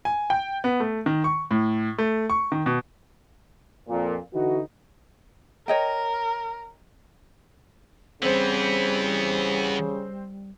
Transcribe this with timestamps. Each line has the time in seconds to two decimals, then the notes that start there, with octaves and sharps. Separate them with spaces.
0.05 G#5
0.30 G5
0.64 B3
0.80 A3
1.06 D#3
1.24 C#6
1.51 A2
1.98 A3
2.30 C#6
2.52 D#3
2.66 B2
3.89 F2 A#2
4.34 D3 E3 D#4 F#4
5.68 A#4 C#5 D#5 G5
8.22 C#3 E3 G3 B3 C4 C5